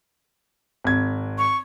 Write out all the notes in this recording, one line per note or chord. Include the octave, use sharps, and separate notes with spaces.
G#1 G#6
C#6